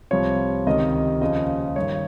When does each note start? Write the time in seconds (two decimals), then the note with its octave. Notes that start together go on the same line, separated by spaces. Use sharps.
0.11 C2 C3 F3 C#5
0.66 C#2 C3 D#3 D#5
1.21 D#2 C#3 F3 D#5
1.76 G2 D#3 C#5